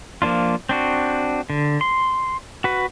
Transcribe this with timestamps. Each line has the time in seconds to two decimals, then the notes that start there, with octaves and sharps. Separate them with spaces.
0.22 F3 A#3 D4 F4
0.69 C4 D4 F#4
1.50 D3
1.81 C6
2.64 F#4 B4